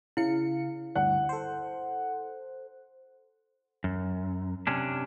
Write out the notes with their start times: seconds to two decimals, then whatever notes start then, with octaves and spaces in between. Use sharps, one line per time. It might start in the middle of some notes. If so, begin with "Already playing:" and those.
0.17 C#3 E4 F5 C#7
0.95 D2 G2 F#5
1.29 A4 C5
3.84 F#2
4.67 C3 C#4 D4